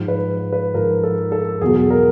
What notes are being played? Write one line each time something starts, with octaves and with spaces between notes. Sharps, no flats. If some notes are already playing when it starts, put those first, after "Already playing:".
Already playing: G#2 F3
B4
B4
G#2 F3 A#4
A4
A4
E2 B2 F#3 G#4
A#4